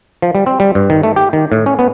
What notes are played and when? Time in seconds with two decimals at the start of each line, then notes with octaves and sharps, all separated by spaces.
0.22 F3
0.35 G3
0.46 C4
0.60 G3
0.75 G2
0.90 D#3
1.03 A3
1.16 G4
1.33 D#3
1.52 A2
1.66 C#4
1.79 B3